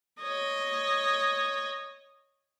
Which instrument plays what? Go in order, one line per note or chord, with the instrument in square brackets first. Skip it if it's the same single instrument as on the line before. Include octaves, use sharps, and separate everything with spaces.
[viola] C#5 D#5